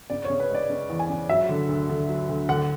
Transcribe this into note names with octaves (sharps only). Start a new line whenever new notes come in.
C#3 D5
C#5
C#3
B4
G#3 D5
C#3
E2
G#5
C#3
F#3 E5
D3
D2
D3
F#3
D2
D3 F#5